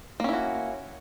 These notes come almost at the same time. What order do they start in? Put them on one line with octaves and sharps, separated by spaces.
A#3 C#4 E4 F#4